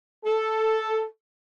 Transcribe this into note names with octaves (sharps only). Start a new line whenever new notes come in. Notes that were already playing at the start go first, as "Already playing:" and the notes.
A4